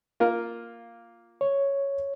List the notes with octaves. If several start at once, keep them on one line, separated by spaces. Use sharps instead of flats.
A#3 F4 A#4
C#5